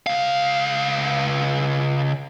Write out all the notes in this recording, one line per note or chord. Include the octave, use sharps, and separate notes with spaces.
C#2 F5